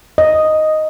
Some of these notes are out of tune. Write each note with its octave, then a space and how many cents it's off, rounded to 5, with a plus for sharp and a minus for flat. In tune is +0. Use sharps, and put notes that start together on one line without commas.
D#5 +0